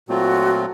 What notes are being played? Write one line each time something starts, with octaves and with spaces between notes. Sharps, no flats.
A#2 F#3 A3 C4 F4 F#4